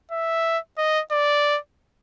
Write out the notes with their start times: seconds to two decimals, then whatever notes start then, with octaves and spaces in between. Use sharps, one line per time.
0.11 E5
0.78 D#5
1.11 D5